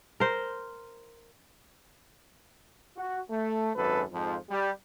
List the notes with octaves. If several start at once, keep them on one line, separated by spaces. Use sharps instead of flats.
A#4 C5
F#4
A3
G#1 F#2 A4 B4
F2 G#2 F3
G3